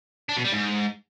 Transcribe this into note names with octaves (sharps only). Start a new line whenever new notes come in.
D4
B2
G3
G#2